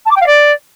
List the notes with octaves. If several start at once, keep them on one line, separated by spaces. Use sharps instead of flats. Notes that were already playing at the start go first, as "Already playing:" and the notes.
A5
D6
G5
F5
D5